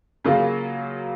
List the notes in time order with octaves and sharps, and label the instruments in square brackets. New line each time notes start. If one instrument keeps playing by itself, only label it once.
[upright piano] C#3 F#3 A#3 F4